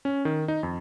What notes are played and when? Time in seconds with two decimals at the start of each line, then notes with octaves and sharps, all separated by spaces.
0.05 C#4
0.25 D#3
0.48 D#4
0.63 F2